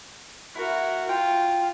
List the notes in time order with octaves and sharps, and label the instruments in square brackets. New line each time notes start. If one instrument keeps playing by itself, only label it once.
[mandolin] E4 [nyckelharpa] F#4 A#4
[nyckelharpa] F4 [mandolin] G5